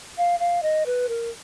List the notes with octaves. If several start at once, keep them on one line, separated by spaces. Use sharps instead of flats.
F5
F5
D#5
B4
A#4